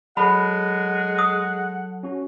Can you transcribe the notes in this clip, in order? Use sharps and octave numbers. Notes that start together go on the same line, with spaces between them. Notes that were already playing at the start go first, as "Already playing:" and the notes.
F#3 G#3 A4 F#5 A5 B5
D#6
C#4 F#4